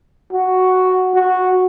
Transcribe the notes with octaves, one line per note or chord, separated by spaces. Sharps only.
F#4
F#4